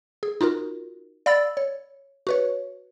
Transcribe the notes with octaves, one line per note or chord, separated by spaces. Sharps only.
G#4
D#4 F4 F#4 A#4
D5 F5 B5 E6 A6
C#5
F#4 B4 C#5